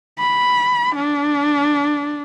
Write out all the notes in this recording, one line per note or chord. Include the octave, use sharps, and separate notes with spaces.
B5
D4